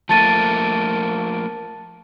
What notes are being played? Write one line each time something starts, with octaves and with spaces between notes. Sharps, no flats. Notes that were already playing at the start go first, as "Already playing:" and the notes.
F3 A3 A#3 A5 A6 D#7